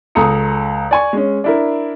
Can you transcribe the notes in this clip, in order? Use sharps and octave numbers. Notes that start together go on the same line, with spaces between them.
C#2 A4 A#5 D#6 C#7
D5 G#5 C#6
G#3 C#4
D4 E4 A#4